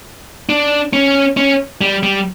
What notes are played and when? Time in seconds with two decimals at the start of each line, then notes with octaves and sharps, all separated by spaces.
0.49 D4
0.93 C#4
1.37 C#4
1.81 G3
2.03 G3